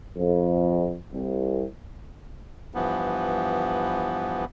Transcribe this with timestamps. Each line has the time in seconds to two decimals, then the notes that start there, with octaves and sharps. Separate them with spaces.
0.17 F2
1.12 C2
2.74 G2 E3 F3 B3